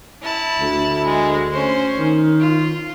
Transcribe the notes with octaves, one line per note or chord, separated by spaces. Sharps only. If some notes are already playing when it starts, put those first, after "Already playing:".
E4 A5
D2
G#3
C#4 C5
D#3
F4